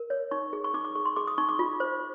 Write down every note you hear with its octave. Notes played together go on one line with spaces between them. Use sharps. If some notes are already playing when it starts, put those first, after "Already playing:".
Already playing: A#4
C#5
D#4 C#6
G#4
C#6
D#4 D6
D6
G#4 C#6
C6
G#4 D6
D#6
D#4 C#6
D6
F4
C5